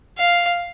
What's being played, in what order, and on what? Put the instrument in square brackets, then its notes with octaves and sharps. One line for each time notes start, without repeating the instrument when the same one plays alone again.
[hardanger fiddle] F5